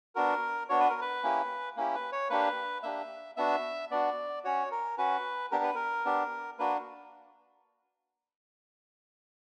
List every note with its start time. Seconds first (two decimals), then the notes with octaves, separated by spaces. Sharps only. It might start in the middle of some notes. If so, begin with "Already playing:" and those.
0.15 B3 D4 F#4 A#4
0.69 B3 D4 F#4 C#5
0.80 B4
0.90 A#4
1.01 B4
1.23 A#3 C#4 E4 G4
1.77 A#3 C#4 E4 G4
1.94 B4
2.12 C#5
2.30 A#3 D4 G4 B4
2.83 A#3 D4 G4 E5
3.37 B3 D4 F#4 E5
3.91 B3 D4 F#4 D5
4.44 C#4 F#4 C#5
4.71 A#4
4.98 C#4 F#4 B4
5.51 B3 D4 G4 A#4
5.64 B4
5.75 A#4
6.05 B3 D4 G4
6.59 A#3 D4 F#4 B4